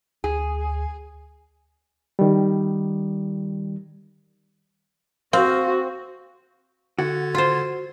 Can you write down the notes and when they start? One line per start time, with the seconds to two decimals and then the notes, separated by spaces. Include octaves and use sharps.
0.24 D2 G#4
2.19 D#3 G3
5.33 C4 F#4 F5
6.99 D3 F#4 G#6 A6
7.35 F4 C5